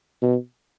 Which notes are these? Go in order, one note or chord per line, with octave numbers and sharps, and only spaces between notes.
B2